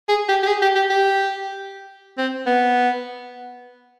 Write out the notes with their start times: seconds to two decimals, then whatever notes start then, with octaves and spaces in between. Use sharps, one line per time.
0.09 G#4
0.29 G4
0.43 G4
0.47 G#4
0.62 G4
0.75 G4
0.90 G4
2.18 C4
2.46 B3